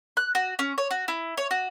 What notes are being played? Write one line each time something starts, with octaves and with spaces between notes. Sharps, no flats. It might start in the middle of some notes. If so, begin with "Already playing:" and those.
F#6
F#4
C#4
C#5
F#4
E4
C#5
F#4